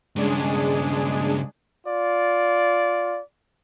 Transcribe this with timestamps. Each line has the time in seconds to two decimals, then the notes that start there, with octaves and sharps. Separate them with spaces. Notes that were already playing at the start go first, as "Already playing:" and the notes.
0.16 G2 C#3 G#3 D4 G#4
1.86 F4 D5